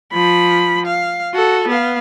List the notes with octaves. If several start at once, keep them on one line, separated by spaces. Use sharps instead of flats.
F3 B5
F5
F#4 A4
B3 F5